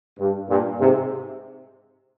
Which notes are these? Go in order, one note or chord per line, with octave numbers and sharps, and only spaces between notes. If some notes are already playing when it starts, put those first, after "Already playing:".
G2
G2 A#2
G#2 C3